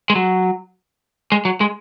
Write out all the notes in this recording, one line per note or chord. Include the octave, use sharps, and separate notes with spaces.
G#3
F#3
G#3
F#3
G#3